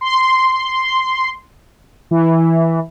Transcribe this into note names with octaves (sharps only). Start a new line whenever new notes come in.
C6
E3